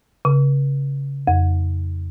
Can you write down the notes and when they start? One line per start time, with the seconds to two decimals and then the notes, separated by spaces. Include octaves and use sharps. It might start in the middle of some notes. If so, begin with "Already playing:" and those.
0.25 C#3
1.27 F2